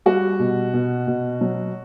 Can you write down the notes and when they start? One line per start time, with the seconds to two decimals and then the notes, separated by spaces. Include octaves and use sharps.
0.06 G3 F#4
0.39 B2
0.73 B2
1.07 B2
1.41 F#3